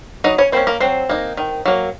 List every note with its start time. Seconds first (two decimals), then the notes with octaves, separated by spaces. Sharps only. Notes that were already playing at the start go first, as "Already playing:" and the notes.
0.24 F#3 D#4 D#5
0.38 C#4 C#5
0.52 A#3 C4 C#4 C5
0.67 A#3 A#4
0.80 F#3 C4 C5
1.09 A#3 D#4
1.37 D#3
1.65 F#3 A#3